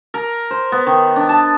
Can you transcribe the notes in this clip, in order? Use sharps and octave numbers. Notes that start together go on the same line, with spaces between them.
A#4
C5
B3
D#3
D4
A5